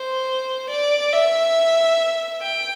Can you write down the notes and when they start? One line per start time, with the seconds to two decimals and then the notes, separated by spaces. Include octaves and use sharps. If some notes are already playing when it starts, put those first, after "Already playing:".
Already playing: C5
0.70 D5
1.13 E5
2.41 G5